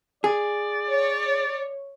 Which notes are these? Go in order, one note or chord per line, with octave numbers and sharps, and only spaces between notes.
G#4 D5
C#5